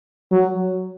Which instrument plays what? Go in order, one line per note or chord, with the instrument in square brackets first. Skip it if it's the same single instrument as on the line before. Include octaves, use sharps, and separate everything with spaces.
[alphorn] F#3